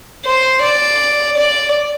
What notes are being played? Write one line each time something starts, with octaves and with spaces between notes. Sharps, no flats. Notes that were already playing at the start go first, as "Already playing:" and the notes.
C5
D5
D5